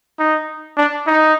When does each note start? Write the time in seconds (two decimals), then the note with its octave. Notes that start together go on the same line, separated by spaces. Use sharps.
0.19 D#4
0.77 D4
1.07 D#4